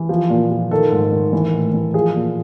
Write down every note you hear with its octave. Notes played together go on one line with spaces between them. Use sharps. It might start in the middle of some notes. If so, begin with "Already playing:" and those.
Already playing: E3
F3
A#2
F3
D#3 A4
G#2
D#3
E3
A2
E3
F3 G#4
A#2